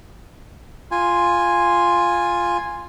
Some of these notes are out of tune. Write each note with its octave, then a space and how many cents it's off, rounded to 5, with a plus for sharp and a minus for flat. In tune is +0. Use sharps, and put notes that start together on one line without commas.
F4 +0 G#5 -5